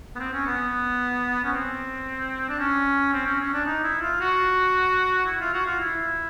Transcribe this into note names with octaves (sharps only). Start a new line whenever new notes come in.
B3
C4
C#4
B3
C#4
C4
D4
C#4
C4
C#4
C#4
D4
D#4
E4
F4
F#4
E4
F4
F#4
F4
E4